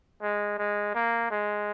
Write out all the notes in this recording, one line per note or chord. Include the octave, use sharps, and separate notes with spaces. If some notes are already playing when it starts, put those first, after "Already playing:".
G#3
G#3
A#3
G#3